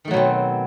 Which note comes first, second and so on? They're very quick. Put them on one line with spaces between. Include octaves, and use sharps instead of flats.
D#3 A3 F#3 B2 C4